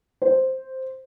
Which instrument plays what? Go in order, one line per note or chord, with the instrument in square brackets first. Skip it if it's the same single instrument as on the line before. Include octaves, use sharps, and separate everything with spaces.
[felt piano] C5